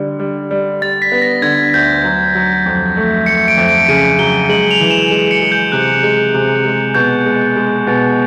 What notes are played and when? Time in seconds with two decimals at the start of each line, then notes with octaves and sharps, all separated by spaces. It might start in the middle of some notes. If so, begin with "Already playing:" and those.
Already playing: D3 G3
0.20 G3
0.51 G3
0.81 G3 A6
1.02 B6
1.12 B3
1.22 A#6
1.42 D3 G#6
1.74 D2 G6
2.04 F#3
2.35 F#3
2.66 F2
2.97 A3
3.26 A3 C#7
3.48 D7
3.57 F2
3.68 D7
3.88 C#3 D#7
4.19 F#3 G7
4.49 G#3 F#7
4.71 F7
4.80 E3
4.91 E7
5.11 G#3 E7
5.31 C#7
5.42 G#3
5.52 G6
5.72 C3 F#6
6.03 G#3
6.34 C3
6.65 G#3
6.95 B2 G6
7.26 G#3
7.57 G#3
7.87 B2